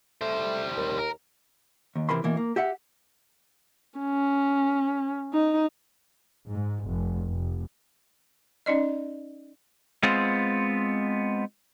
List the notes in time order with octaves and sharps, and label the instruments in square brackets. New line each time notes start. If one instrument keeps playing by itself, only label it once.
[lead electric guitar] G3 C5 [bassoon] A3
[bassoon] D#2
[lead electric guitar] A#4
[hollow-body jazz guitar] D#2
C3 E3 A#4 B5 C6
B2 E3 A#3
A#3
G4 E5 F#5
[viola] C#4
D#4
[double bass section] G#2
F1
F1
[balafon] C#4 D#4 D5 D#5
[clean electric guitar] G#3 B3 C4 F4